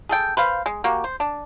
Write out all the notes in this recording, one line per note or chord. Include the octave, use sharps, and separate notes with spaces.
G#4 A4 G5
B4 C5 F5
G#3
A#3 F#4 G4
C5
D4